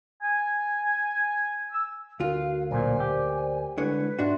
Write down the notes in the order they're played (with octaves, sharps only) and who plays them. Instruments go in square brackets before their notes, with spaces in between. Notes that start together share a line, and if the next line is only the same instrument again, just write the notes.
[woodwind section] G#5
E6
[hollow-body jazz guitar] D2 F4 [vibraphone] F#4 A#4 [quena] F5
[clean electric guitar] B1 A#2 [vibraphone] A#4 C5 D5 [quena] G#5
[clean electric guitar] G4
[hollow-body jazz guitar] C2 D3 C#5 [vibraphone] G#3 E4 [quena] B4
[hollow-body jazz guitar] G#2 D4 F#4 [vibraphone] E5 C6